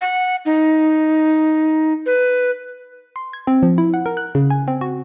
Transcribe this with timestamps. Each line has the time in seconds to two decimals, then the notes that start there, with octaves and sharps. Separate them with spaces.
0.01 F#5
0.45 D#4
2.06 B4
3.16 C6
3.33 G#6
3.47 C4
3.63 F3
3.78 E4
3.94 F#5
4.06 A#4
4.17 F#6
4.35 C#3
4.50 G#5
4.68 C4
4.81 F#4